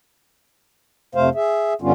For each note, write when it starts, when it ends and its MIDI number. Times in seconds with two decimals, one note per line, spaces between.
1.15 1.30 41
1.15 1.30 48
1.15 1.30 57
1.15 1.30 72
1.15 1.30 77
1.35 1.74 68
1.35 1.74 76
1.82 1.93 43
1.82 1.93 50
1.82 1.93 55
1.82 1.93 59
1.82 1.93 61
1.82 1.93 65